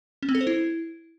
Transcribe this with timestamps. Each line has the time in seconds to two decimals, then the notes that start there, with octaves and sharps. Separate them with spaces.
0.23 C#4
0.29 C4
0.35 A4
0.41 C5
0.47 E4